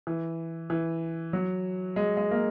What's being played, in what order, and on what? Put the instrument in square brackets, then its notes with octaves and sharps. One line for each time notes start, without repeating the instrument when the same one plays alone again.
[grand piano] E3
E3
F#3
G#3
G#3
A#3